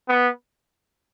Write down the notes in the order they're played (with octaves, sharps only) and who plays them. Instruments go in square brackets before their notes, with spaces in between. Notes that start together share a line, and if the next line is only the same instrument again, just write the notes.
[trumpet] B3